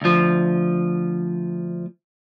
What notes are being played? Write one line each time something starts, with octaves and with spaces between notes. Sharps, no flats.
D2 F3